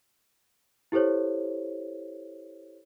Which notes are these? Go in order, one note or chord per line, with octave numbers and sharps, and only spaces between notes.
E4 G4 A4 C5 C#5